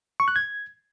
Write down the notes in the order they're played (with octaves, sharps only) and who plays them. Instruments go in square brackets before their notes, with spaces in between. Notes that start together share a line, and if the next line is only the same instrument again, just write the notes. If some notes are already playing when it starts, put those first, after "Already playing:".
[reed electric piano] C#6
F#6
G#6